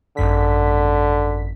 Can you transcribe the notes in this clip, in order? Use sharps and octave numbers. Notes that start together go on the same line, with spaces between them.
G#1 F#2 D3 B6